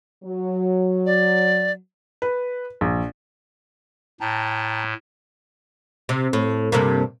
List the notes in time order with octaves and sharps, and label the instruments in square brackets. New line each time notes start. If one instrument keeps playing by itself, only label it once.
[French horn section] F#3
[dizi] D5
[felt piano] B4
A#1
[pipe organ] A2 [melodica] G5 A5 A#5
[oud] C3
A2
G2 C3 A#3